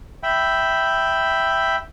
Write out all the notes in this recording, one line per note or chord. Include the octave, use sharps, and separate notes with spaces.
E5 G5 B5